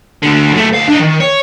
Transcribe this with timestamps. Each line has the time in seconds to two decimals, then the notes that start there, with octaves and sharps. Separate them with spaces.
0.22 D2 D3
0.52 F#2 A3
0.73 D2 F5
0.88 D4 D#5
1.00 D#3
1.20 C#5